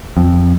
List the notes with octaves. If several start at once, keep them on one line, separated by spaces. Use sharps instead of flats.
F2